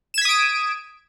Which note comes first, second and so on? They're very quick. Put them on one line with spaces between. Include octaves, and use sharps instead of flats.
E7 G#6 B6 D#6 D7